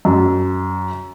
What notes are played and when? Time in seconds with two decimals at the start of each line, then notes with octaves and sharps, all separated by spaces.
0.05 F#2